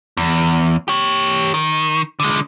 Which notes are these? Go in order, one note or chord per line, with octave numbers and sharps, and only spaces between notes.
E2
G4 C#5
D#3
D3 G#3